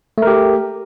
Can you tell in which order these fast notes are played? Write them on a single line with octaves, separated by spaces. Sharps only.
A3 A#4 G4